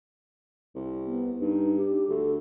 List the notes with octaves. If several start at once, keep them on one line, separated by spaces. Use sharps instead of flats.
C2
B3
G2 D#4
G4
D2 A4